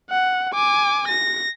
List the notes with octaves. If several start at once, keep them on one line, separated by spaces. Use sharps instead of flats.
F#5
G#5 D6
A#6